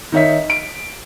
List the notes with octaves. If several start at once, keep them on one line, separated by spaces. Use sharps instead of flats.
D#3 D#4 C#5 E5 B6
D7